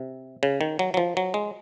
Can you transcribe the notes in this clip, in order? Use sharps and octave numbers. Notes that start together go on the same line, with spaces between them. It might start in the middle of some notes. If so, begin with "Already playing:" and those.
Already playing: C3
C#3
D#3
F#3
F#3
F3
F#3
G#3